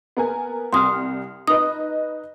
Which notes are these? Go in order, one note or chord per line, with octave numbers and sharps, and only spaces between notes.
B3 A#4 G#5
C2 C6 D#6 F6
D#4 B4 D#5 D#6